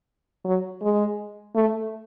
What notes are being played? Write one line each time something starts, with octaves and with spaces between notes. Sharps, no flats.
F#3
G#3
A3